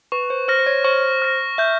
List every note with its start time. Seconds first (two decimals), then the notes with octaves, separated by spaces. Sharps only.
0.12 B4 C#6
0.30 C5
0.48 C5 F6 A#6
0.59 C5
0.67 C#5
0.84 C5 C#6
1.22 F6 A#6
1.58 E5 G6